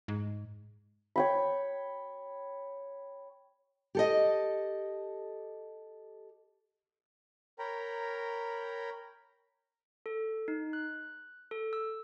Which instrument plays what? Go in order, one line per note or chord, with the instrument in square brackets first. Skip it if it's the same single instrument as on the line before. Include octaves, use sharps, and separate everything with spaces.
[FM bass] G#2
[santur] C#5 G5 B5
[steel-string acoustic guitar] G4 A4 D#5
[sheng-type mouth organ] A#4 C#5 G5 A#5 B5
[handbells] A4
D#4
F#6
A4
E6